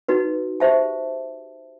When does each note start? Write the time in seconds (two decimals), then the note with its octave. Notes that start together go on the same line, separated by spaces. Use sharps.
0.08 D#4 F#4 B4
0.60 G4 C5 E5 A5